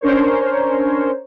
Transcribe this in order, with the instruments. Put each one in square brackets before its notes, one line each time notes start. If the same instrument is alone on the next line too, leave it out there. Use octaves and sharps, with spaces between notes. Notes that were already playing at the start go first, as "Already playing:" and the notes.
[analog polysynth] C#4 D4 A#4 C5 C#5